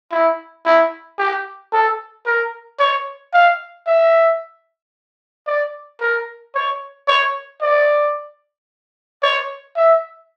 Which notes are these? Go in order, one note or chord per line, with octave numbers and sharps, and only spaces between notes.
E4
E4
G4
A4
A#4
C#5
F5
E5
D5
A#4
C#5
C#5
D5
C#5
E5